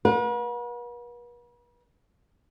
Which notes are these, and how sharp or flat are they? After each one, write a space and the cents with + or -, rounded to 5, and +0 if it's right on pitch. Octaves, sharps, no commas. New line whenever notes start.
B4 -45 F#5 -40